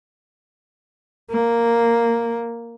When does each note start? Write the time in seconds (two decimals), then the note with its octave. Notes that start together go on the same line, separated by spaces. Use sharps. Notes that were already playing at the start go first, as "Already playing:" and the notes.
1.31 A#3